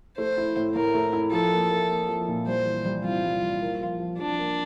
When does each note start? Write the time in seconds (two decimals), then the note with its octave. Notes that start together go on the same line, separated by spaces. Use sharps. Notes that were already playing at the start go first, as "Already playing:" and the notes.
0.18 A3 C5
0.38 E4
0.56 A2
0.75 A2 A#4
0.94 A3
1.13 E4
1.32 F3 A4
1.52 A#3
1.70 A#3
1.90 A#3
2.08 F3
2.28 A#2
2.47 G3 C5
2.66 E3
2.85 G3
3.04 C2 F4
3.24 G3
3.43 G3
3.62 A#3
3.81 F3
3.99 F3
4.19 F3 D4
4.38 A#3